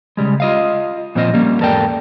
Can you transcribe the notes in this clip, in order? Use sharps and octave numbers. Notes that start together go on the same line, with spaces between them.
C#3 G3 G#3
F4 D#5 F5
A#2 F3 C4 F4 C#5 D#5
G3 A#3 C#4
E2 G#2 A4 A#4 D5 G5